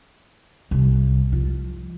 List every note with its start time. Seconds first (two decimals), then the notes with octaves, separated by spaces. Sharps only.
0.71 C2
1.32 F3